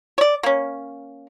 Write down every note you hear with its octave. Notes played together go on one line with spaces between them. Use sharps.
C#5 D5
A#3 C#4